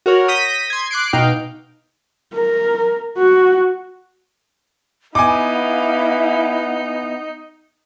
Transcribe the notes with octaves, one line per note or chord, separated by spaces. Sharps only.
F#4 A#4 C#5
D#6 G6 A#6 B6 D#7
C6 G#6
D6 F#6 C7 D7
B2 D#4 F5 G5
A#4
F#4
B3 D#4 E4 F5 G#5 D6